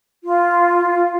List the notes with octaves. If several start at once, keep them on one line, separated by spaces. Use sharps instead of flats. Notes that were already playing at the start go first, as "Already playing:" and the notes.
F4